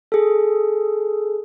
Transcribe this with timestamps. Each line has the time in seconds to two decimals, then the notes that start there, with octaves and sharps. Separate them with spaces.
0.12 G#4 A4